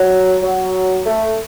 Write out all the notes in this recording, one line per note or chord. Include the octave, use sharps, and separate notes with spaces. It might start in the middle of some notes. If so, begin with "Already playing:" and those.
Already playing: F#3
F#3
A3